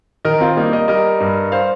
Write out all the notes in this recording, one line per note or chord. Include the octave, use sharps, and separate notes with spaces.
D#3 A#4 D#5
C4 F4
G3 A#3 D#4
A#4 D#5
G3 A#4 D#5
G2
C5 F5